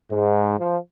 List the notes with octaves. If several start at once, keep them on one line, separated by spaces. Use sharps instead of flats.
G#2
F3